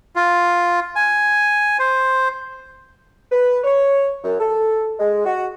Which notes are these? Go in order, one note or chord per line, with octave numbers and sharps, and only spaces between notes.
F4
G#5
C5
B4
C#5
F#2
A4
G#3
F#4